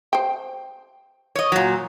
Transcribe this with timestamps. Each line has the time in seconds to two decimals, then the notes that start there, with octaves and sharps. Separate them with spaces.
0.13 C5 G5
1.36 C#5 D#5
1.52 A#2 F#3